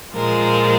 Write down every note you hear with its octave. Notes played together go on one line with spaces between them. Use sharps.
A#2 F3 G#3 A#4